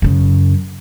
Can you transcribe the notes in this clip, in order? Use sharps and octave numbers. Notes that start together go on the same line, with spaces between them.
F#2 C#3